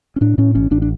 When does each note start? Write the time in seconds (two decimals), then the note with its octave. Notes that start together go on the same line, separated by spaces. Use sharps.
0.16 C#4
0.21 A2 D4
0.38 A2 C#4
0.55 A1 C#4
0.71 A1 D4
0.82 D4